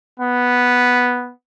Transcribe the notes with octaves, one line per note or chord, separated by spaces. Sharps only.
B3